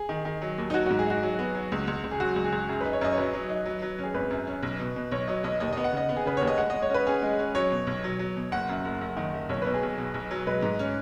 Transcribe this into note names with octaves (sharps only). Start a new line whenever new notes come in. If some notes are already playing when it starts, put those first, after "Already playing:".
Already playing: G#4
D#3
D#3
F#3
D#2
D#4
F#3 F#4
G#2 F#4
G#4
D#4 F#4
F#3
B3
F#3
C#2
C#2
C#2
G#4
F#3 F#4
C#2
G#4
C#2
F#2 G#4
D#4 B4
C#5
F#2 D#5
C#5
F#3 B4
F#3
D#4
F#3
F#3
C#4 G#4
G#1 B4
F#2
C#4
B1
B2
B2
B1 C#5
F#3 D#5
B1 D#5
D#2 D#5
B3 D#5
F#5
C#3 D#5
B3
G#4
C#3 B4
D#2 C#5
D#5
G#3 F#5
G#3 D#5
C#5
C#4 B4
C#4 G#4
G#3
C#4
F#3 C#5
B2
B1
F#3
F#3
B2
F#1 F#5
F#2
F#1
F#1
D#3
F#1
B1 C#5
B2 B4
G#4
B1
B2
B1
F#3
G#3 B4
G#2
C#4